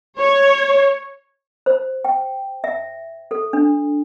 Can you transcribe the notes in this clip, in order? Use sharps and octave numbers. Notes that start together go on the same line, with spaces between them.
C#5
C5
G5
E5
A4
D4